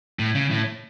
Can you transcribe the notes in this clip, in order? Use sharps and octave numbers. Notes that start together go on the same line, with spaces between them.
A2
C#3
A2